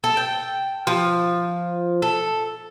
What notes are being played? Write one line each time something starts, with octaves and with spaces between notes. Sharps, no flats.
A4
G5
F3
A4